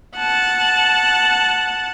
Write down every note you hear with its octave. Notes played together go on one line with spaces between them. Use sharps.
F#5 A5